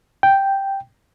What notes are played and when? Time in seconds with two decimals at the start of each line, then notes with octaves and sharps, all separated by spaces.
0.23 G5